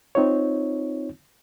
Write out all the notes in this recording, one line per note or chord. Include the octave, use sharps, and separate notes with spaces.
C4 D#4 F4 C#5